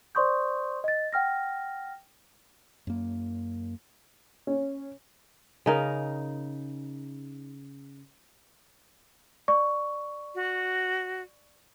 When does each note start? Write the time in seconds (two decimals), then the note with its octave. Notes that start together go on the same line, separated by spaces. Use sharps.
0.15 C5 D5 C6 C#6 D#6 G6
0.84 D#5 A6
1.13 F#5 G5 F6 A#6
2.87 F#2 A#3
4.47 C#4
5.66 C#3 D#4 A#4
9.48 D5 C#6
10.35 F#4